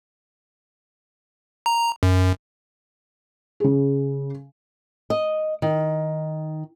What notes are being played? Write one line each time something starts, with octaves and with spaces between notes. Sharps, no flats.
A#5
F#2
C#3 G#4
D#5
D#3